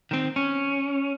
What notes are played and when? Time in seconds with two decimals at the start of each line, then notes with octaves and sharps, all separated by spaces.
0.11 D#3 C4
0.36 C#4